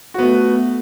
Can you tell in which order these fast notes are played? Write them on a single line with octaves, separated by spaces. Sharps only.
F#4 B3 A3